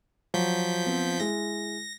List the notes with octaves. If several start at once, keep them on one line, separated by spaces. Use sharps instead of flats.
F3 F#3 G6 B6
B3 C4
G#3 E4 A#6